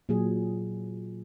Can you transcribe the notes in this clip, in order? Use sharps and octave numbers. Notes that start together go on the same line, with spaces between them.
A#2 F#3 G#4